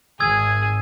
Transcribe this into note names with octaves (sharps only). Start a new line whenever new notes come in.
G#1 G#4 D#6 E6 G#6